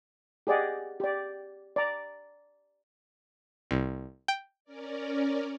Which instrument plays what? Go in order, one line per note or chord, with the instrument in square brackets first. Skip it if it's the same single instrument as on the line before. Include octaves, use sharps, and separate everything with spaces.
[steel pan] G4 G#4 D5 D#5 F#5
G4 D5
D5 A#5
[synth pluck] C2
G5
[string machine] C#4 A#4 D5